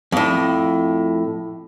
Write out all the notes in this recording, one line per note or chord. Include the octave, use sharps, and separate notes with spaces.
F2 A2